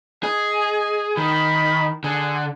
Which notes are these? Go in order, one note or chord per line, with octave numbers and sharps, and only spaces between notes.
G#4 D#5
D#3 B5
D3 G#4